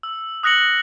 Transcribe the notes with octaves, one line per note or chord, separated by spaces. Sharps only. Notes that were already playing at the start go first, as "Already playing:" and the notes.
E6
D#6 F#6 A#6 C#7 F#7